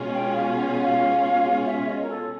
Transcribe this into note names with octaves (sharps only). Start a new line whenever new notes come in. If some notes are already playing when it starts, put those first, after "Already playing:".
Already playing: B2 G#3 C#4 F4 G#4
G5
F5
F#5
F#5
F5
E5
D#5
A#4
A4